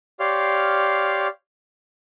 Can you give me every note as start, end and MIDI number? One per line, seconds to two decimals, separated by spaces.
0.20 1.27 67
0.20 1.27 73
0.20 1.27 74
0.20 1.27 77
0.20 1.27 84
0.20 1.27 89